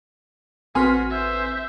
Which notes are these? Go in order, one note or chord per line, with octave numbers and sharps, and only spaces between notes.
A1 C4 F#4 B4 G#5 C6 F6 B6
C5 E5